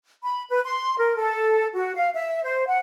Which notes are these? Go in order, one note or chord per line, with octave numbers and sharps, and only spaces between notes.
B5
B4
C6
A#4
A4
F#4
F5
E5
C5
F#5